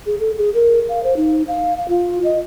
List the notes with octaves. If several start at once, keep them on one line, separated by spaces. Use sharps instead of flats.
G#4
A4
G#4
A#4
F5
C5
D#4
F5
F5
F4
D#5